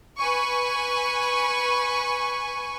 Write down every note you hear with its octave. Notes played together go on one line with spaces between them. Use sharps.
B4 G#5 C#6